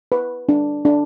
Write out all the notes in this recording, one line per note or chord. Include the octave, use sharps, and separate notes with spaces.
B4
D4
D4